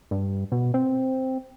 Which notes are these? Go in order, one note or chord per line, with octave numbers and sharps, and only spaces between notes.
G2
B2
C4